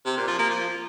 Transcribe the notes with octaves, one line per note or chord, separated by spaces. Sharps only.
C3
A#2
F3
A#3
F3